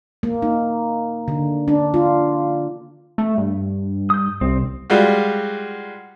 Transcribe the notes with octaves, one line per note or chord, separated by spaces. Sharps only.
A#3
D#4
D3
D4
F4
A3
G2
D#6 G6
C2 C4
G3 G#3 F4 F#4